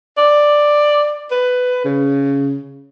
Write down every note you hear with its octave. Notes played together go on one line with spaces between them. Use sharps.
D5
B4
C#3